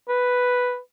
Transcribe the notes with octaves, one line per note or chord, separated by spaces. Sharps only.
B4